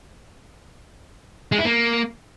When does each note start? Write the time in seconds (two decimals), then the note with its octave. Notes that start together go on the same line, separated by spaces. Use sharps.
1.52 G#3
1.58 E4
1.65 A#3